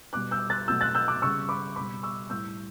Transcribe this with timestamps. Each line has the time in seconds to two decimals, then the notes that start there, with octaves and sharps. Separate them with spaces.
0.13 B2 G3 D6 F#6
0.31 E6 G6
0.50 F#6 A6
0.68 B2 F#3 A3 E6 G6
0.81 F#6 A6
0.95 E6 G6
1.08 D6 F#6
1.22 C#3 G3 C#6 E6
1.49 B5 D6
1.76 B2 G3 B5 D6
2.03 C#6 E6
2.30 A2 G3 E6 G6